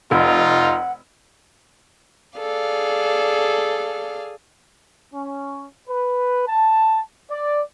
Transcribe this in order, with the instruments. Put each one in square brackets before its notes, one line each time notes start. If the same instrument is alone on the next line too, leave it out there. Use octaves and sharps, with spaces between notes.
[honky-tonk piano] F1 [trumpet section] D#4 F4 [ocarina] F#5
[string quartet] G#4 A4 D5 F5
[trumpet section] C#4
B4
A5
D5